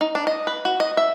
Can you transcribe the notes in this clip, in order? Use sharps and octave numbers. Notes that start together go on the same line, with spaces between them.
D#4
D4
D#5
B4
F#4
D#5
E5